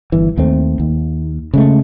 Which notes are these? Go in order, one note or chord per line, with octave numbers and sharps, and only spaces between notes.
G1 E3
D#2 A3 C4
D#2
C#3 G#3 A3